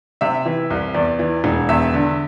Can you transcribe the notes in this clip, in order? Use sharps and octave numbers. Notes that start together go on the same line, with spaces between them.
C3 E5
E3
C2
E2 D5
E3
E1
E2 E5
D3